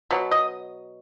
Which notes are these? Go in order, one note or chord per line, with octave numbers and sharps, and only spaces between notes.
B2 F#3
D#5